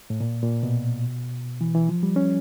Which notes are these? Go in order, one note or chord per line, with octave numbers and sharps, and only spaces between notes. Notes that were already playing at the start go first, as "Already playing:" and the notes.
A2
A#2
A#2
B2
E3
E3
F3
G3
C#4